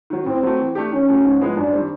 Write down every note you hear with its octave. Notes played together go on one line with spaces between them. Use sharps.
D#3 F#3
A2 C4
F#3 A3
E3
A3 D4 G4
D#3 C#4
F#3 A3
G#2
F3 G#3 B3 E4
F#2 D4
D#3 G3 C4